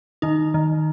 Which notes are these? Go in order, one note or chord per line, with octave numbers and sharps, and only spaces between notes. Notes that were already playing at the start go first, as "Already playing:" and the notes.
D#3 D#4
D#3